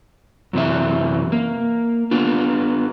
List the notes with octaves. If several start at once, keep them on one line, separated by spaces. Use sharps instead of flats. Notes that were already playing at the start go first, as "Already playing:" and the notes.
F#2 C3 E3 E5
A#3
B3 D4 F4